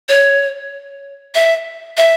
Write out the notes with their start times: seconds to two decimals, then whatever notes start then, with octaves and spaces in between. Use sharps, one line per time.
0.09 C#5
1.35 E5
1.97 E5